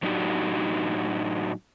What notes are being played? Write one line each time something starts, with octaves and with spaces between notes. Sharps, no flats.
A2 F#3 D4 D#4 F#4 G4